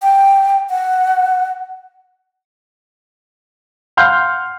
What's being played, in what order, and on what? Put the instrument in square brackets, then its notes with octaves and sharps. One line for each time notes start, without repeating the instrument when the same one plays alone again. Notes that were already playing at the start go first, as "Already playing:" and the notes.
[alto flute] G5
F#5
[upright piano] F5 F#5 C6 F6 G6